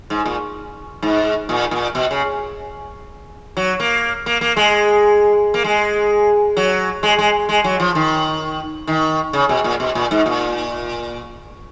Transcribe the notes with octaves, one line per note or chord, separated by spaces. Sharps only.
G#2
A#2
G#2
A#2
A#2
B2
C#3
F#3
A#3
A#3
A#3
G#3
A#3
G#3
F#3
G#3
G#3
G#3
F#3
F3
D#3
D#3
C#3
B2
A#2
B2
A#2
G#2
A#2